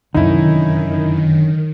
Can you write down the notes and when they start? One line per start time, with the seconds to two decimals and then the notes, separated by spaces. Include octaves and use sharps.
0.14 F1 F#2 D3 D#3 C#4 D#4 E4